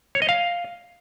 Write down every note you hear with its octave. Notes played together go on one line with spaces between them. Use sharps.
C#5
D#5
F5